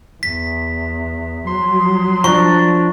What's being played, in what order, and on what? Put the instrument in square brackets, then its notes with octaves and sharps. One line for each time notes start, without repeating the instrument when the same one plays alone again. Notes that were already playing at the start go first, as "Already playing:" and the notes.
[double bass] E2 [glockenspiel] B6
[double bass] F#3 [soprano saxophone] C6
[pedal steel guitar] F3 D4 [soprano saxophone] A#5 [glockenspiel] C#6